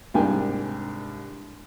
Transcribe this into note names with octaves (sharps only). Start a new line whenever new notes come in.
C2 G#2 D4 A#4 G5 G#5